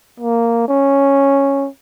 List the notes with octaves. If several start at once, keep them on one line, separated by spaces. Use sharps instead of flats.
A#3
C#4